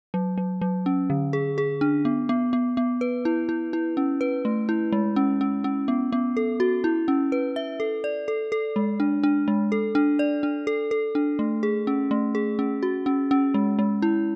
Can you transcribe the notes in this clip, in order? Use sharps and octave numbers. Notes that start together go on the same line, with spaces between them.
F#3
F#3
F#3
C#4
D3
G#4
G#4
D4
B3
B3
B3
B3
B4
E4
E4
E4
C#4
B4
A3
E4
G#3
C#4
C#4
C#4
B3
B3
A4
F#4
E4
C#4
B4
E5
A4
D5
A4
A4
G#3
D4
D4
G#3
A4
D4
D5
D4
A4
A4
D4
A3
G#4
C#4
A3
G#4
C#4
F#4
C#4
C#4
G#3
G#3
E4